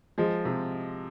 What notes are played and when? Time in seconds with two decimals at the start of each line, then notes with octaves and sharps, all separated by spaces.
0.18 F3 G#3
0.45 C3